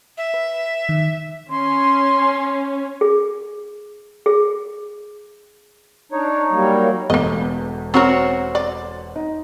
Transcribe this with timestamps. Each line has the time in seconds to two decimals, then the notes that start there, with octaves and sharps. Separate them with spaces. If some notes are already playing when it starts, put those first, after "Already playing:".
0.18 E5
0.34 B4
0.89 D#3
1.50 C#4 C6
3.01 G#4
4.26 G#4
6.12 D4 D#4 C#5
6.51 F#3 G3 A#3
7.10 E1 E2 A3 A#3 D#5
7.94 C4 C#4 F#4 A#4 C#5
8.55 D5
9.16 D#4